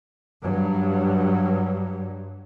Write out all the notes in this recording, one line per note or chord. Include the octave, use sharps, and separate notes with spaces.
G2 F#3